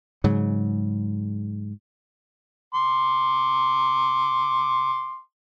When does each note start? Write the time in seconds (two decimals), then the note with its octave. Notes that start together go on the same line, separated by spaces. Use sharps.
0.24 G#2 C#3 F#3
2.75 C6 D6